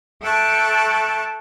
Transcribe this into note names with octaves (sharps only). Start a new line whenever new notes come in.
A4 E5 G5 A5 C#6 F#6